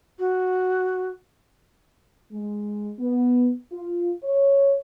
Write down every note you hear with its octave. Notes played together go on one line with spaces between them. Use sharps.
F#4
G#3
B3
F4
C#5